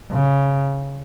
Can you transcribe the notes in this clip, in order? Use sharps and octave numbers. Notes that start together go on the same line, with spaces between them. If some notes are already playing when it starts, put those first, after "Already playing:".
C#3